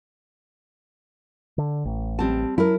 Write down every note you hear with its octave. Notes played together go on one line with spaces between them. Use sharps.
D3
A1
G3 C4 A5
F#3 E4 A#4